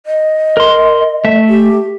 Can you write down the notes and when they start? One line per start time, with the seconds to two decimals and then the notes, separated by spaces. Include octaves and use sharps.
0.06 D#5
0.57 A#4 C6
1.24 A3 E5
1.49 G4